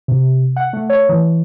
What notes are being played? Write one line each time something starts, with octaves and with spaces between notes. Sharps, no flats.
C3
F#5
A3
C#5
E3